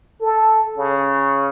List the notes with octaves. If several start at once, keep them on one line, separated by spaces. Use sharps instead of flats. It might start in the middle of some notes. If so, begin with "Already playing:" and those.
A4
C#3